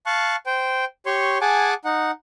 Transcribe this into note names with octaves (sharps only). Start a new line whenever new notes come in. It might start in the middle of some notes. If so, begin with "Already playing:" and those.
F5 A5 C#6 F#6
C5 G5
G4 C#5 C6 C#6
G#4 F#5 G#5 A5 D6
D#4 F#5